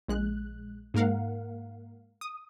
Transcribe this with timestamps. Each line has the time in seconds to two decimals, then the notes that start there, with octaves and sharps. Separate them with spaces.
0.08 A#1 G#3 F#6
0.94 G#2 A#3 A#4 F5 F#5
2.21 D#6